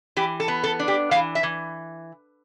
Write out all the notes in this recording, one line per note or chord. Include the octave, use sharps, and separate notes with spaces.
E3 G4
A4
B3
A4
D4
G4
E3 F5
E5
E3